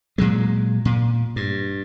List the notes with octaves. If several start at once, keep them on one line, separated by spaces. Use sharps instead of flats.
A#2 F#3 G#3
A#2
G2